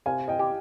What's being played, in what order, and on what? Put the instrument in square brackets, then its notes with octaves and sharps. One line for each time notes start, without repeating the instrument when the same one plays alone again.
[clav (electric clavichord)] C3 [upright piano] F5 G#5
[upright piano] D#5 G5
[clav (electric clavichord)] G4